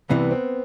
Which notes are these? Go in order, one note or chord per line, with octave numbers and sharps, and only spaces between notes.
C2 C3 E3 B3
C4